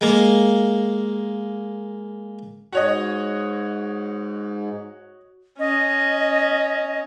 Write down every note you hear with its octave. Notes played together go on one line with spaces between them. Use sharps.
G#3 A#3
G#2 F#4 C#5 D#5
C#4 D#5